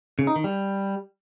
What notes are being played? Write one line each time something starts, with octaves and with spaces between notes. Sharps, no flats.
C#3
D#4
D#3
G3